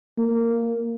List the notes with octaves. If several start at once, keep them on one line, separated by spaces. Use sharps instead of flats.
A#3